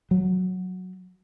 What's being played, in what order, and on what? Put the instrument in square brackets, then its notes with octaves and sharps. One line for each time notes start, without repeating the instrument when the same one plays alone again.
[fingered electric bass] F#3